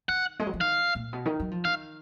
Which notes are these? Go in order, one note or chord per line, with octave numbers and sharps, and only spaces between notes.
D#3 F#5
G#3
F#3
F3
D#3 F5
A#2
B2
D#3
F#3
F3
D#3 F5